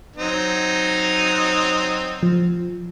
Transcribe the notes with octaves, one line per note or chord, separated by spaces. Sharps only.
F#3 C4 D#4
F3